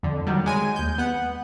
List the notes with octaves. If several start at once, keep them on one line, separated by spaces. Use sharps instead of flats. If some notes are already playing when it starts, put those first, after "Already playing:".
F2 D3
D#3 F#3 G3
G#3 G#5 D#7
D#2 G6
B3 F#5